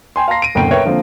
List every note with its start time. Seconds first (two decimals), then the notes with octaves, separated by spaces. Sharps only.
0.16 G5 G#5 C6
0.28 F5 A5 A#5 C6 A#6 C7
0.42 D7 D#7
0.55 F#1 D2 B2 G5 D7
0.71 A#4 B4 C#5 E5 G5
0.85 D3 F3 A#3 C4